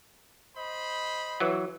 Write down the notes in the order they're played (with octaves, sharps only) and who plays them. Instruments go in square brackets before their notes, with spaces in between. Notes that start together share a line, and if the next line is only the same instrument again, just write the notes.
[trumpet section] C5 D#5 B5
[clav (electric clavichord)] E3 F#3